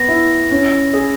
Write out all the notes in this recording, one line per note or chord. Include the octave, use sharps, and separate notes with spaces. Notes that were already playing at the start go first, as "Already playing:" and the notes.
Already playing: B3 A#6
E4
C#4
G#4